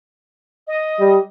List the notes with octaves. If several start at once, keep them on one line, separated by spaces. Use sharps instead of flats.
D#5
G3